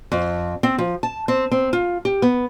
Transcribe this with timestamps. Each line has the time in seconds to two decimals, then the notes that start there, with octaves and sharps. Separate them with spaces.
0.12 F2
0.63 C4
0.78 F3
1.03 A5
1.28 C4
1.51 C4
1.73 F4
2.05 G4
2.22 B3